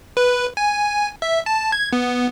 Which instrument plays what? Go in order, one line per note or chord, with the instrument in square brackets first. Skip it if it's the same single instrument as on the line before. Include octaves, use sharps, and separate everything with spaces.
[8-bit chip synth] B4
G#5
E5
A5
G#6
B3